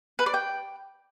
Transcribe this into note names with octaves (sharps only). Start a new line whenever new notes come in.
B4
D5
G5